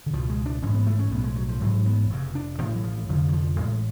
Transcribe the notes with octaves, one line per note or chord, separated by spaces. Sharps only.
D3
C#2 B2 F3
G#3
D4
A1 G#2 C#4
B3
A3
C#4
B1 A2 B3
G#3
F#3
F3
A1 G#2 F#3
B3
F1 F2 C#3
D4
A1 A2 F3
F#3
F3
F1 F2 D3 F3
F#3
F3
A1 A2 G#3